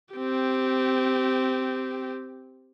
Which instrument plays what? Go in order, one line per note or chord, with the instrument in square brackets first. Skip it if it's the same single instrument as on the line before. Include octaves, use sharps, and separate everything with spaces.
[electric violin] C4 G4